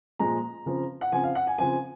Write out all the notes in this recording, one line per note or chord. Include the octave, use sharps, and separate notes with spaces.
A#2 F3 G#3 A#5
C#3 F3 C4
F#5
C#3 F3 C4 G#5
F5
F#5
G#5
C#3 F3 C4 G#5